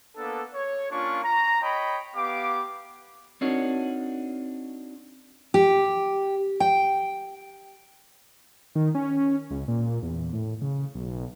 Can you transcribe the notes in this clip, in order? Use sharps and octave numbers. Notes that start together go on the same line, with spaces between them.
A#3 B3 D4 A4
C#5
A#3 C#4 D4 F4 C#6
A#5
C#5 D#5 G5 B5
B3 G4 F5 D6
C4 D4 D#4 F#4 A#4 C#5
G4
G5
D#3
C#4
C#2
A#2
E2
A2
C#3
B1